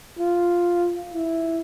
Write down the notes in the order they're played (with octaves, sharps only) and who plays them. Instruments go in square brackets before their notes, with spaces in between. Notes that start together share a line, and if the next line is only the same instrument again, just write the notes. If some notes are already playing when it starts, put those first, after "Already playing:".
[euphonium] F4
E4